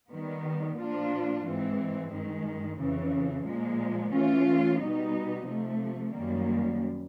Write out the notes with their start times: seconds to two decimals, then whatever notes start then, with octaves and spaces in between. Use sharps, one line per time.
0.10 D#3 G3 B3
0.77 A#2 F3 A#3 D4 F4
1.44 G#2 E3 G#3 C4
2.11 G2 D#3 G#3
2.78 F2 C#3 E3
3.46 A#2 F3 G#3
4.12 E3 A3 C#4 F4
4.79 B2 G3 B3 D#4
5.46 C3 F3 A3
6.13 F#2 D#3 G3 A#3